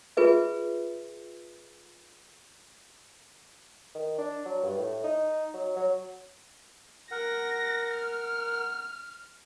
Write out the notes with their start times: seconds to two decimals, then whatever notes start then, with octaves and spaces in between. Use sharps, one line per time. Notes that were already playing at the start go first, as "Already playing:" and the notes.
0.17 F4 G#4 B4 E5
3.95 D#3
4.18 D4
4.45 F#3
4.63 G2
4.78 A2
5.04 D#4
5.54 F#3
5.76 F#3
7.11 A#4 F#5 A#6
7.94 F6